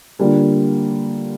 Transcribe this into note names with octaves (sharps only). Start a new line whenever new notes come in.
D3 G3 A#3 D4 F4